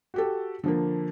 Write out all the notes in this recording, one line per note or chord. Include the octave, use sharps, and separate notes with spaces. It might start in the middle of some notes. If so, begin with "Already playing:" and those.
F#4 G4 A4
D3 F3 A#3